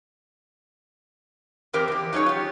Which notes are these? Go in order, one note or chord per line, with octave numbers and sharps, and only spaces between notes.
F2 E3 C4 G4 A#4 C5
E2 G4
F#3 C#4 D#4 G#4 C#5
F4 G4